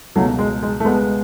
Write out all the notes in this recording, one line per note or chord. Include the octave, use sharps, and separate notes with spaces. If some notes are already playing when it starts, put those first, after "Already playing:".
C#2 B2 F#3 A3
G#3
G#3
A3
G#3 B3